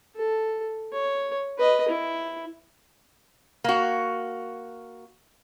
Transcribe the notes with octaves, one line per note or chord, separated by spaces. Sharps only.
A4
C#5
B4 D#5
E4
A#3 F#4